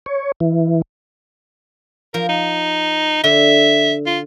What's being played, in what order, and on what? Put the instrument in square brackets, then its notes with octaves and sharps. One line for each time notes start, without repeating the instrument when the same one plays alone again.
[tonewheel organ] C#5
E3
[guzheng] F3 [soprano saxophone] A#4
[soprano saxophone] D#4
[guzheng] D3 [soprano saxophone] E5
[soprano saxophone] F4